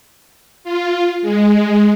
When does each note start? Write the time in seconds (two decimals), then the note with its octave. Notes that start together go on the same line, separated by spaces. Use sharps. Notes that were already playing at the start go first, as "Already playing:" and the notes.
0.64 F4
1.22 G#3